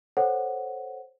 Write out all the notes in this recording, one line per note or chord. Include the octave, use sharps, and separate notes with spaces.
A4 C5 C#5 F#5